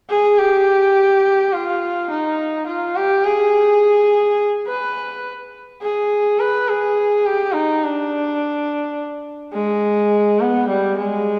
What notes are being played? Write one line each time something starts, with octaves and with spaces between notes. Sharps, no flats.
G#4
G4
F4
D#4
F4
G4
G#4
B4
G#4
B4
G#4
G4
D#4
D4
G#3
B3
G3
G#3